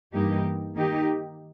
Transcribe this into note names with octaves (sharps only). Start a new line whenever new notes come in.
G2 E3 A#3 D#4 G4
D#3 A#3 D#4 G4